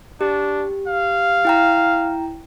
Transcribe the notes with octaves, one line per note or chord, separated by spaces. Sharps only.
D4 G4
F5
E4 G5 A#5